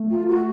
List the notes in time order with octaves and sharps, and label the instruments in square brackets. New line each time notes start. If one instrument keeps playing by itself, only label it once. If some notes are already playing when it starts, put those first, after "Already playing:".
Already playing: [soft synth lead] A3
[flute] F4
F#4